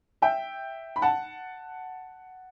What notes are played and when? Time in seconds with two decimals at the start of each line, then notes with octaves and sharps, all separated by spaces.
0.22 E5 G5
0.96 B5
1.02 F#5 A5